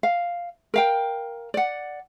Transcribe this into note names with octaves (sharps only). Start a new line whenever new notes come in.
F5
A#4 F5 G5
D5 F#5